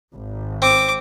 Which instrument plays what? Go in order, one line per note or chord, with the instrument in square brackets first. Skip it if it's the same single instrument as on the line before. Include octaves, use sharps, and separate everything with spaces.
[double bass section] G#1
[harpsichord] C4 [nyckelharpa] D6